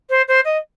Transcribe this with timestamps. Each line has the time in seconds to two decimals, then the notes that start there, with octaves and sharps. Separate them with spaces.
0.09 C5
0.28 C5
0.45 D#5